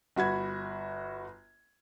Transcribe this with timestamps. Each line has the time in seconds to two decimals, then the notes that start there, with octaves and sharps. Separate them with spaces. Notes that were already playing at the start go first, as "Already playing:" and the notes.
0.16 G1 F#4 B5 G#6